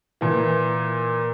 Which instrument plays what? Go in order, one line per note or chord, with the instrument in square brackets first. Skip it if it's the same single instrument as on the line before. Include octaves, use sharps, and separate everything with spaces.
[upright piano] A#2 E3